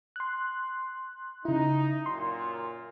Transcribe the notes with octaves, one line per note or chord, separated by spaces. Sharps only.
C6 F#6
C#3 D#4 E4
F#2 A#2 C6